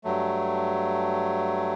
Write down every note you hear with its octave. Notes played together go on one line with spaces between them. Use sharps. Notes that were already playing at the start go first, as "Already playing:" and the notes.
G2 F#3 A3